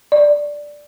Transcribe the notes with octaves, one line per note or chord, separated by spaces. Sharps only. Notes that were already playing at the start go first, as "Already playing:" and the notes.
D5